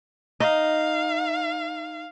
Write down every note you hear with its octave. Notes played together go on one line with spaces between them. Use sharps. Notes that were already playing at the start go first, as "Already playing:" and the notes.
D#4 F5